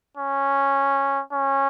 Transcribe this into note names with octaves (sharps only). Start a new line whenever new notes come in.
C#4
C#4